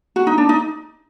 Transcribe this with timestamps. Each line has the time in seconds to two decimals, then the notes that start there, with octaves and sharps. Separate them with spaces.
0.16 F#4
0.27 D#4
0.38 D4
0.49 D#4